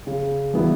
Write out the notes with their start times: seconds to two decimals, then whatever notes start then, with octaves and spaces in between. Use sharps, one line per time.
0.07 C#3
0.54 E3 G3 B3 E4